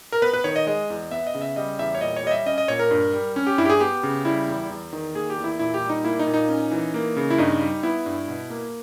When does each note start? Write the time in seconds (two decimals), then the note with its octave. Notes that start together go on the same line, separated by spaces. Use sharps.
0.12 A#4
0.22 B3 B4
0.33 B4
0.44 D#3 C#5
0.56 D#5
0.67 G#3 D#5
0.90 E2
1.11 B3 E5
1.27 D#5
1.35 C#3
1.41 E5
1.56 G3 D#5
1.79 E2 E5
1.95 C#5
2.01 A#2 D#5
2.16 C#5
2.23 G3 D#5
2.31 E5
2.46 C#4 D#5
2.58 D#5
2.68 A#2 C#5
2.79 A#4
2.91 G2
3.13 G3
3.36 C#4
3.47 G4
3.58 G2 E4
3.65 G4
3.70 G#4
3.80 B3 G4
4.03 C#3
4.25 G3 E4
4.48 E2
4.70 E2
4.93 D#3
5.15 A#3 G#4
5.30 G4
5.37 E2
5.44 E4
5.59 A#2 E4
5.74 G4
5.82 G3
5.89 D#4
6.04 A#3 E4
6.19 D#4
6.27 A#2
6.34 D#4
6.49 C#4
6.71 E3
6.94 A#3
7.16 C#3
7.30 E4
7.38 G2 D#4
7.60 G3
7.83 B3 E4
8.06 G2
8.28 B2
8.50 A#3